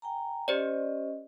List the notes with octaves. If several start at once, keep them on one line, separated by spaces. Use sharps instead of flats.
G5 G#5 A#5
C#4 G4 C5 D5 D#5